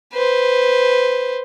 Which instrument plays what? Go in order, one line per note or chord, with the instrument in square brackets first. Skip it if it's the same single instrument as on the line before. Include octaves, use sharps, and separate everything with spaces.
[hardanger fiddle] B4 C5